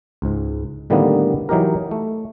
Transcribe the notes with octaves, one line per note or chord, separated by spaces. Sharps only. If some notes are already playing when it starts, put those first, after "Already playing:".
C#2 G#2
A2 D3 D#3 G3 A#3 B3
E3 F#3 D#4 G4 A#4
A3